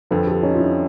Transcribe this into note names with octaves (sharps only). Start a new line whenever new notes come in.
F2 D3 F3 A4 B4
G4 A4
C#4 D#4
F4
D4 E4